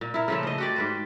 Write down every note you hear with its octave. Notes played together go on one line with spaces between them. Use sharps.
A#2
E4 A#4
C#3 F3 A3
C5 D#5
F#4 G4 D5
G#2 B4 C5